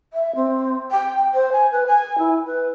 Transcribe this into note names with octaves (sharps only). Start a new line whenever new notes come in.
E5
C4
G5
C5
G#5
B4
G#5
E4
B4